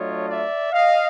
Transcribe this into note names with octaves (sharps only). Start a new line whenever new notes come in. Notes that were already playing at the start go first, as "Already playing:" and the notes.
Already playing: F#3 A3 D4 F4 C#5 D#5
D5 E5
D#5 F5